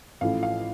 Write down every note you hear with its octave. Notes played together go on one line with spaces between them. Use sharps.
A1 A2 F3 F5
F5